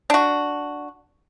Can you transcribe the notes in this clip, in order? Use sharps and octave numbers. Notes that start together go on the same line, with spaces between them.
D4 F#4